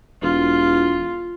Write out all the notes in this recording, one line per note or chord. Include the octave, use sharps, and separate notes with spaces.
E1 F4